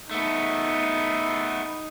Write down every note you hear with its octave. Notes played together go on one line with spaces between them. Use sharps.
A3 B3 D#4